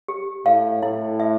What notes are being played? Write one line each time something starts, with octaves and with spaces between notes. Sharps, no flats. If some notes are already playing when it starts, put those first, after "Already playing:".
G4
A2 F5
A2 E4
E5